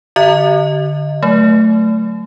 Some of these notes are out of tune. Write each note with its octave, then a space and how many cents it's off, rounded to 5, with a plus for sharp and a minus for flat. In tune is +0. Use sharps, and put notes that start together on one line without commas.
D3 +0 D#5 +0
F#3 +0 A3 +0